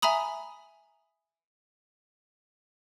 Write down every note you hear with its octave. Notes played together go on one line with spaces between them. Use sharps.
E5 G#5 A#5 B5 D#6